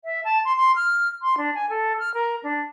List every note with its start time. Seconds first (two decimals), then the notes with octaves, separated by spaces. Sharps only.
0.05 E5
0.25 A5
0.45 C6
0.57 C6
0.76 F6
1.22 C6
1.38 D4
1.55 G#5
1.70 A4
1.99 F6
2.14 A#4
2.43 D4